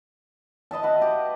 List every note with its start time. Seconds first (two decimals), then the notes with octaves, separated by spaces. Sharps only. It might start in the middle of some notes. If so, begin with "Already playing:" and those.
0.71 B4 D#5 E5 A5
0.83 F#4 B4
1.02 G4